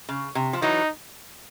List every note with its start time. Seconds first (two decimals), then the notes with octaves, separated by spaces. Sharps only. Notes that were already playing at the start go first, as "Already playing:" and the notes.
0.09 C#3
0.35 C3
0.53 F3
0.62 E3 F#3 D#4